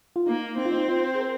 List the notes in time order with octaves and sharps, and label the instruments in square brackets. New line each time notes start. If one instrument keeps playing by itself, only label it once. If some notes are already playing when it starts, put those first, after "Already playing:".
[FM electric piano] F4
[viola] A#3 [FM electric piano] D#4
[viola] C4 [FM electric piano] D#4
[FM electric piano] F4
D#4
F4
G#4
A#4